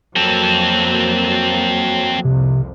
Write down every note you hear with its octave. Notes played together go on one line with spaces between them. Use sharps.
F2 F#3 A#3 C4 A4
C2 F2 C3